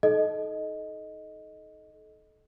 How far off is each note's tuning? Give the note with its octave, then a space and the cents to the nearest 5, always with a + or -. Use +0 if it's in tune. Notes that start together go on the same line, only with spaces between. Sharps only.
D#4 +25 A4 -25 D#5 +0